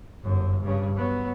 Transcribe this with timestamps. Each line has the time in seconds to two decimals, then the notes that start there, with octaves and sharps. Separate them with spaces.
0.23 G1 F#2
0.62 G2 C#3
0.95 F#3 B3